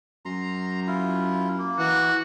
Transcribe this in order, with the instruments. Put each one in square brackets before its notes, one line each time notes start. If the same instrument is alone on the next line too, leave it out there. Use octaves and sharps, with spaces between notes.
[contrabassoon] F#2 [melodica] A#5 C6
[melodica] E4 F4
A#3
[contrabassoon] E3 [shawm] F#4